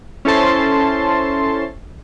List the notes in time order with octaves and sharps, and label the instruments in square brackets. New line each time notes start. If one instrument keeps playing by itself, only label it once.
[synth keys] C#4 E4 A4 C5 A5 C6